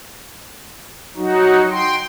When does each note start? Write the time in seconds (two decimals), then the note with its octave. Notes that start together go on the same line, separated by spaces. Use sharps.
1.17 F#3 D#4 F#4
1.71 G5 C6